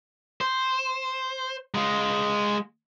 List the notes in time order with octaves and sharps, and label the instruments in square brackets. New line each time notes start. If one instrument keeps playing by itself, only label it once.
[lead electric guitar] C5
G#3 F4